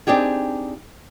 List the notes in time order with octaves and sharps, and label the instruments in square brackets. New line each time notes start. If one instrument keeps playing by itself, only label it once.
[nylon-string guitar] C4 D4 D#4 G4 G#4